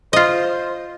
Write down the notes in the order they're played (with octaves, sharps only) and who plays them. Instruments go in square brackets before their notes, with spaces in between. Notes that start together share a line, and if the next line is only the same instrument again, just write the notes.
[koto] F4 D#5 [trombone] C5